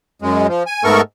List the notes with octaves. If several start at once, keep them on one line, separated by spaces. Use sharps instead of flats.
F#2 G#3
F3
G#5
G#2 A3 B3 A4 A#4 C#6